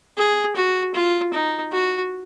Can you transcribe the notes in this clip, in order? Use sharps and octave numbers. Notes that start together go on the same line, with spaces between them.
G#4
F#4
F4
D#4
F#4